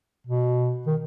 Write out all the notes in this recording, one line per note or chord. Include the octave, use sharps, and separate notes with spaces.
B2
D#3